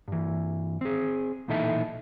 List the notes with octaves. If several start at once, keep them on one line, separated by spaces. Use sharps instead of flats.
G2 E3
C4 G#4
B1 A#2 E3 D#4 A4 E5